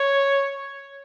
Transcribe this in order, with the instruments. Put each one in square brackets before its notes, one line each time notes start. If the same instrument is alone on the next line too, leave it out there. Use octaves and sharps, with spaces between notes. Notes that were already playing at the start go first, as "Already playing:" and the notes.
Already playing: [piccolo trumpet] C#5